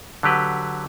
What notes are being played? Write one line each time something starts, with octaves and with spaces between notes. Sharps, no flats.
D3 F#3 G4 B4